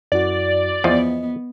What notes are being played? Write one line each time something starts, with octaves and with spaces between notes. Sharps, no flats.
F#2 E4 F#4 D5
E2 F3 B3 D#5